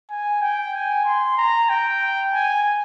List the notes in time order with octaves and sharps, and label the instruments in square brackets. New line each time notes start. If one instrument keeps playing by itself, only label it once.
[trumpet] G#5
G5
G#5
C6
A#5
G5
G#5